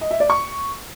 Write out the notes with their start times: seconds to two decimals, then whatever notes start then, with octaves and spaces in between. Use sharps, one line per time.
0.01 D#5
0.11 E5
0.20 D5
0.30 C#6